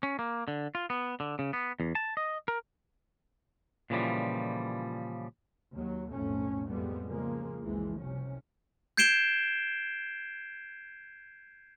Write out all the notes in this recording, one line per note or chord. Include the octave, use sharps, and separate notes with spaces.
C#4
A#3
D3
F4
B3
D3
C#3
B3
E2
A5
D#5
A#4
A#2 C#3 E3 F3 G3
D#2 F#3
B1 F2 A2 A3 C#4
F2 A2 G3 G#3 B3
C#3 F3 G#3 A#3
F#1 C#2 E3 F3 G#3
C2 C3 C#4
G6 G#6 C7 D7 E7 G7